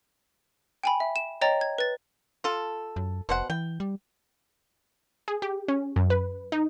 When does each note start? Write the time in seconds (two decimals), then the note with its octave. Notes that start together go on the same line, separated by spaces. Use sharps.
0.83 G5 G#5 B5
1.00 E5
1.16 E7
1.41 C#5 D#5 G5 A#5 A6
1.61 G#6
1.78 B4 A6
2.44 F4 A4
2.96 F#2
3.29 F1 B2 C5 F#5
3.50 E3 G5
3.80 G3
5.28 G#4
5.42 G4
5.68 C#4
5.96 F#2
6.10 B4
6.52 D#4